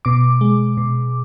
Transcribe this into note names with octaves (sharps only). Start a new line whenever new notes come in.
B2 D6
G#3
B2